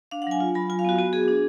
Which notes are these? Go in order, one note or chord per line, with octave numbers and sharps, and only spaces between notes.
D4 F5
F#5
F#3 G#5
F4
F#3 B5
F4 G#5
F5
B3 F#4
B3 F#4
B3 G#4
D4